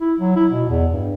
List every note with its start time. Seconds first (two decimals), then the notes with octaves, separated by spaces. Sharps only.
0.01 E4
0.19 F#3
0.36 E4
0.51 B2
0.69 E2
0.91 G2